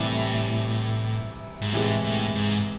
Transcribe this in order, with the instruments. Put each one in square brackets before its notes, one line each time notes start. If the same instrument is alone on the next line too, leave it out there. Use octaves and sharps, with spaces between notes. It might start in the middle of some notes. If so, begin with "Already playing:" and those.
Already playing: [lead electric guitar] A2 [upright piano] C3 E3 G3
[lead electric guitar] G#2
[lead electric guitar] A2 [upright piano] C3 E3 G#3
[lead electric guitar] A2
G#2